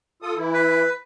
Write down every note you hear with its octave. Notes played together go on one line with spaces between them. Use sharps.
F4 A4 D#6
E3 E4
B4